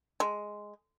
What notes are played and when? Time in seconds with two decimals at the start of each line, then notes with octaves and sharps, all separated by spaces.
0.20 G#3